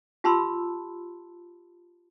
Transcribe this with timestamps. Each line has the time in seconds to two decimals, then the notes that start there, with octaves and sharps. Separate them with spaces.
0.24 F4 G4 A5 B5 C6 E6